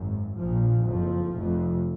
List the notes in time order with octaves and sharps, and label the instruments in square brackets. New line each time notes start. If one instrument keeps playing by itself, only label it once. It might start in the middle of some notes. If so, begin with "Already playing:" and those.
Already playing: [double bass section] G#1 F#2
A#1 A#2 F3
F#1 F2 F3
F1 F2